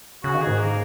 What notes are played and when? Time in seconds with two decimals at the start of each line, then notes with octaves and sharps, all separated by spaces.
0.23 C#3 F#4
0.35 D#3
0.41 G#4
0.47 G#2
0.59 A#3